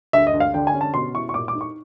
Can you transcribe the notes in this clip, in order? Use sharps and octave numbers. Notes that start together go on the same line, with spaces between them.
D2 E5
D#5
D2
F5
D3 G5
G#5
C#4
A5
B2 C6
E4 C#6
C#6
A#2 D6
D6
D#4
C#6